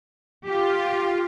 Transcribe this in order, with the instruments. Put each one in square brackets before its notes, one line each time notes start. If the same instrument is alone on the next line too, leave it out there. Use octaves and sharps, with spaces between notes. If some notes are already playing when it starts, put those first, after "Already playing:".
[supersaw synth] F4 [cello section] G4